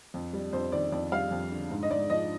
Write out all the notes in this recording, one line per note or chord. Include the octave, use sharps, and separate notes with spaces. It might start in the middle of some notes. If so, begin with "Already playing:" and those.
F2
G3
F2 C5
D#3 D5
F2 D5
G3 F5
F2
D3
G#2
D#5
G#2 D5
F3 D#5